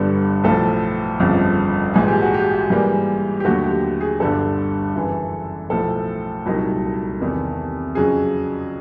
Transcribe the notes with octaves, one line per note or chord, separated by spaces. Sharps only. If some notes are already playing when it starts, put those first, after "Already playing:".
Already playing: G1 G2 D3 G3 B3 A4
B1 A2 F3 A4
G1 F2 C#3 F3
A#1 G#2 E3 G#3 G#4
G4
F#4
G4
G#2 E3 G3 A#3
G4
D#2 D3 F#3 A3 F#4
G4
G4
G#4
G1 G2 D3 G3 A4
F#2 C#3 E3
B1 A2 F3 A3 A4
C2 A#2 F#3 A#3 D#4
E2 C3 D#3
F2 C#3 F#3 G#4